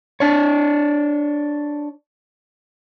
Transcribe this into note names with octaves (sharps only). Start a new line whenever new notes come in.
D4 C#5